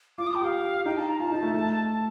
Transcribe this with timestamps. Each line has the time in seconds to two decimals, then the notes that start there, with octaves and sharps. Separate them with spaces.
0.18 F4 D6
0.27 D#6
0.30 F4
0.35 G5
0.42 G4 F5
0.86 D#4 G5
0.97 A5
1.10 A#5
1.20 F4 A5
1.32 D#4
1.42 A3
1.54 A3